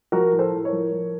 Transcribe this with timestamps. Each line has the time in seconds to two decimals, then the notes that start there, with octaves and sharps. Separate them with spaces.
0.12 F3 F#4 A#4
0.32 A2
0.39 A4 C5
0.52 A2
0.65 A#4 C#5
0.72 F3
0.92 F3